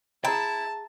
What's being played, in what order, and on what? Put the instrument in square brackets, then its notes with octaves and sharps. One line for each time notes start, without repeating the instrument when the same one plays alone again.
[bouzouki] E4 [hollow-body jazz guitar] G#4 G5 [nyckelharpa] A5 [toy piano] A#5